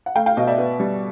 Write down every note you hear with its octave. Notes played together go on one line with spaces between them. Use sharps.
F#5
A3 F5 G5
F5 G5
B2 D#5 F5
D5 E5
B3
G3